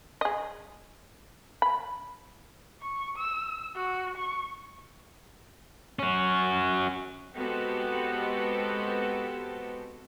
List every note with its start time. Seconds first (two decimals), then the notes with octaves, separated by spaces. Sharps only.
0.21 G#4 D#5
1.62 B5
2.82 C#6
3.16 E6
3.75 F#4
4.17 C#6
5.99 C#4 F#4
7.36 G#3 B3 C4 F#4 G4 A4